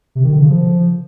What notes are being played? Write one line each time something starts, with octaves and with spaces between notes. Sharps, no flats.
C3
D#3
D3
C#3
F3